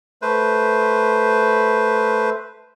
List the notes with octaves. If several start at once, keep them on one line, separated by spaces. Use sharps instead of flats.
A3 B4 C5